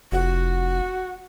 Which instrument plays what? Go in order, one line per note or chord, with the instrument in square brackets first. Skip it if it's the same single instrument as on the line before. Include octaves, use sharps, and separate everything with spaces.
[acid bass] F1 [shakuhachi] F#4